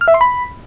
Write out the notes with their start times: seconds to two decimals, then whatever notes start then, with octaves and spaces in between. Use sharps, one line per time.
0.01 F6
0.08 E5
0.14 C6
0.21 B5